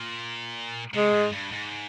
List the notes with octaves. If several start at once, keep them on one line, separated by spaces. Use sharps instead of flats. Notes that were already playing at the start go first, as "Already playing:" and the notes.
Already playing: A#2
C3 G#3
G#2
G2
G#2